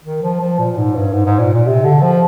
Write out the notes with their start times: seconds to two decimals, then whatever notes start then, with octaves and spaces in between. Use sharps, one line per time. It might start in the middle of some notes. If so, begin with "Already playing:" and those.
0.05 D#3
0.22 F3
0.40 F3
0.58 A#2
0.77 G#2
0.95 G2
1.12 G#2
1.25 G#2
1.39 A#2
1.53 A#2
1.67 C3
1.84 D3
2.02 F3